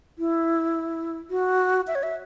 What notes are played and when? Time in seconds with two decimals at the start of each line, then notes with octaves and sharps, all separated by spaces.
0.19 E4
1.31 F#4
1.87 E5
1.95 C#5
2.03 E5